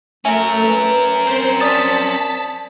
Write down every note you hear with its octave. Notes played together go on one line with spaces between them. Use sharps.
A3 C#4 A#4 E5 G#5
B4
C4 C5
D5 A5 D#6 A6 B6